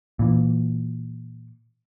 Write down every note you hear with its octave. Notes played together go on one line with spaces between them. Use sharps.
A#2 E3